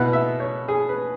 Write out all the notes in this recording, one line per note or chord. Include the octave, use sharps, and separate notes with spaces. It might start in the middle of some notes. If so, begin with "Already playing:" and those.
Already playing: B2 B3 E4 F#5
E5
C#5
G#4
B4